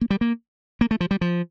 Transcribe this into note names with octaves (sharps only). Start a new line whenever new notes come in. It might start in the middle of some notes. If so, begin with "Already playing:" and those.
A#3
G3
A#3
A#3
A3
F3
G3
F3